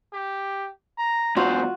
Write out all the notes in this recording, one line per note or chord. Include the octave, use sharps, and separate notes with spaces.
G4
A#5
E2 G#2 F4 F#4 C5